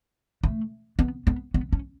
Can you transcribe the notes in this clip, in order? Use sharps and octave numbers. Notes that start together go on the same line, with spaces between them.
A3
B3
B3
B3
C#4